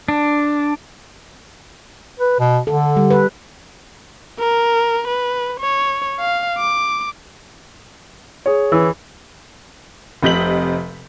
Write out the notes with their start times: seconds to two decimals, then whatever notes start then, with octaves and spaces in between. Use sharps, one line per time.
0.08 D4
2.20 B4
2.39 B2
2.67 D3 A4
2.96 G3
3.10 B4
4.40 A#4
5.08 B4
5.60 C#5
6.20 F5
6.58 D6
8.46 G#4 C#5
8.72 E3
10.23 F1 C3 D#5 G6 B6 F#7